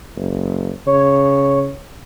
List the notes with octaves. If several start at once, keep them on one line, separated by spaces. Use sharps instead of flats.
F#1
C#3 C#5